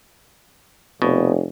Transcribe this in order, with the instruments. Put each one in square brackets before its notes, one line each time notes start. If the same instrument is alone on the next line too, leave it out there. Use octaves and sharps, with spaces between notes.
[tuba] F1 [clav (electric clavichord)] B2